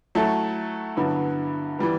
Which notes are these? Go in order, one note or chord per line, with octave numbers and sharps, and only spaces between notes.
F#3 A3 E4 A4
G2 D3 F#3 B3 E4
E3 G3 B3